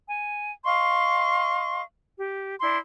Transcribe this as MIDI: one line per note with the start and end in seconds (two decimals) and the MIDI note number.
0.07 0.50 80
0.65 1.80 75
0.65 1.80 77
0.65 1.80 84
0.65 1.80 85
2.18 2.55 67
2.60 2.76 62
2.60 2.76 64
2.60 2.76 84